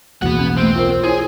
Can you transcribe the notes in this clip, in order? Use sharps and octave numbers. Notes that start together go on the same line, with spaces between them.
D1 B1 E2 A#3 B3 F#4 F#5
C#4
A3 C4
F4 A#4 C5
E4 G#4 C#5 G#5